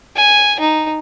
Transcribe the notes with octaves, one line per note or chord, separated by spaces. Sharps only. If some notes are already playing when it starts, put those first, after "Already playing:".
G#5
D#4